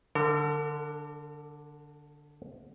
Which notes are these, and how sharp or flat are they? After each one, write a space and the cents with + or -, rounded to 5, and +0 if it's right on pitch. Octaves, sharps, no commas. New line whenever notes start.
D3 +0 A#4 -45